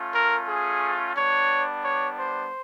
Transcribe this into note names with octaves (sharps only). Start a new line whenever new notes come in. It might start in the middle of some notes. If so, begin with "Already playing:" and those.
Already playing: A3 C#4 F4
A#4
G#4
G3 B3 D4 C#5
C#5
C5